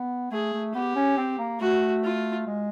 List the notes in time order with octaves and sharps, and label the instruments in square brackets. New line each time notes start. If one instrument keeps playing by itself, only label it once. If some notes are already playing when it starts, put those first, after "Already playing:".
Already playing: [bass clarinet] B3
[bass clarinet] A3 [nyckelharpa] G#4
[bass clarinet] A3
[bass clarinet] B3 [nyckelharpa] G4
[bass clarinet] C#4
C4
A#3
[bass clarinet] A3 [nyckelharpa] F#4
[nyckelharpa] F4
[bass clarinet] G#3